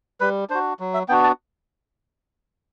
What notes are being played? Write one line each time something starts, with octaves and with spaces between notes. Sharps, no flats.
G3 B4
D4 F#4 C5
F#3
E5
B3 D4 F#4 G5
A5